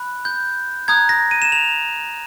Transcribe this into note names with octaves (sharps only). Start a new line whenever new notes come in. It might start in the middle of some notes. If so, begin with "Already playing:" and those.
Already playing: B5 F#6
G6
A#5 D#6 F#6 G#6
A#6
D#7
E7
F7